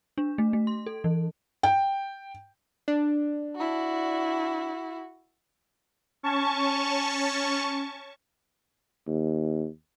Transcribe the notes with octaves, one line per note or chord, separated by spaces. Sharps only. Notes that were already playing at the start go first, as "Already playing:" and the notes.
D4
A3
A3
C6
A4
E3
G5
D4
E4 F#4
C#4 A5 C#6
D#2